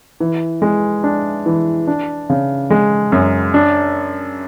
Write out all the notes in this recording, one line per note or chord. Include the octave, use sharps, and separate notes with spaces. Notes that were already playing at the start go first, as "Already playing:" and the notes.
E3
G#3
D4
E3
D4
C#3
G#3
F#2
D4